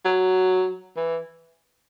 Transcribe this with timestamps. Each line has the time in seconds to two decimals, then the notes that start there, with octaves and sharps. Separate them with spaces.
0.05 F#3
0.96 E3